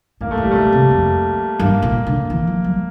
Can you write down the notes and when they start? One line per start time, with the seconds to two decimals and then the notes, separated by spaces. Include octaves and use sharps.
0.21 A2 A#3
0.31 A3
0.37 A2
0.42 G3
0.51 A#2 A3
0.73 C3
0.91 F2
1.59 G2 A#3
1.82 A#2
2.07 D3
2.30 E3
2.47 F3
2.64 G3